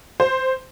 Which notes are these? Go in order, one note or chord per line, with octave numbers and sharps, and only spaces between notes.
C5